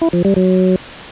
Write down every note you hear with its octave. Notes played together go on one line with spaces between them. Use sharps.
E4
F3
G3
F#3